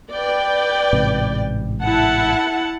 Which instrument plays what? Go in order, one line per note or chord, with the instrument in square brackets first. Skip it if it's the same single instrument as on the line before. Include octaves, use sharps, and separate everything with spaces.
[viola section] B4 D5 G5
[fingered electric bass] A1 G#2 C3
[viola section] E4 F#5 A5